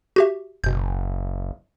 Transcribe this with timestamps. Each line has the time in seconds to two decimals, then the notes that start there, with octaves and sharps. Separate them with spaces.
0.16 F#4 G4 E5
0.64 F#1 B2 G6